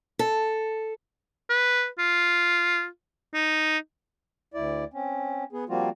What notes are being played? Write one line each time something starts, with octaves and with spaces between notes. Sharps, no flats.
A4
B4
F4
D#4
D2 E4 D5
C4 C#4
B3 G#4
F3 G3 A#3 C4 F4 F#4